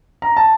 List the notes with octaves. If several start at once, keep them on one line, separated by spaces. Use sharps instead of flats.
A#5
A5